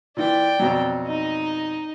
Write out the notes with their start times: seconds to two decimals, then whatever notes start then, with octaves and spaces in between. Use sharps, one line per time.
0.17 A#2 E3 D5 G5
0.59 F2 B2 F#3
1.07 D#4 D#5